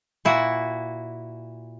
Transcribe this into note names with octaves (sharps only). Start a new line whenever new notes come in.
A#2 E4 F#4